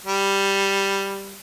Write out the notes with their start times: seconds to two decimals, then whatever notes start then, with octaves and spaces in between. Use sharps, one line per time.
0.06 G3